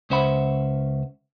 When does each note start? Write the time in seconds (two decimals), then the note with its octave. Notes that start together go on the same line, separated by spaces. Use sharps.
0.10 C#2 C#4 C5 E5 F#5 B5